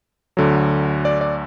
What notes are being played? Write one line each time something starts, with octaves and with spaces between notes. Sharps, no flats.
D2 D3 F#3
D5
D5